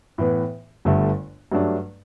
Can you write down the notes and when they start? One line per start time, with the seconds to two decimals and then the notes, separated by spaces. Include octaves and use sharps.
0.18 A2 E3 B3
0.85 G1 G2 D3 A3
1.52 G2 F#3 A3 D4